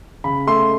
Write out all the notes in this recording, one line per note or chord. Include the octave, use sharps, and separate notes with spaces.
C#3 B5
A3 C6